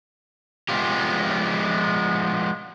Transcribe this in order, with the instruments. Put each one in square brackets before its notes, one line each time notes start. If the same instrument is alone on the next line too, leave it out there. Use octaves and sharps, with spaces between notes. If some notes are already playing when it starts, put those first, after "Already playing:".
[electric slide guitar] F3 G#3 A#3 B3 F4 G4